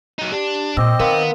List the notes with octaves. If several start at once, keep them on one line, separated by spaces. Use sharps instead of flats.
F#3 D#4
D4 G4
A#2 C4 D#5 G5 D6 E6
D#3 B3 A#4 F5 C6